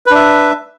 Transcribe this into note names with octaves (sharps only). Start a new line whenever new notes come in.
D4 B4 E5